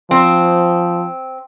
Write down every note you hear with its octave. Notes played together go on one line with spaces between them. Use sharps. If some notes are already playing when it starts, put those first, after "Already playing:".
F3 C4